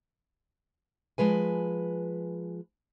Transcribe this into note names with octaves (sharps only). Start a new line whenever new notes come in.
F3 G#3 B4 G#5